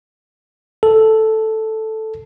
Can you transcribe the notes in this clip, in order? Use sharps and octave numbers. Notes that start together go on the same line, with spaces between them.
A4